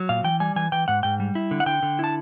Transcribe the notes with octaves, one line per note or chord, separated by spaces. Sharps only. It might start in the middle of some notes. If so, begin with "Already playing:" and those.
Already playing: F#3
A#2 F5
E3 G5
G3 G#5
E3 G#5
E3 G5
G#2 F#5
G#2 G5
G3
E4
D3
F#5
D3 G5
D3
E4 A5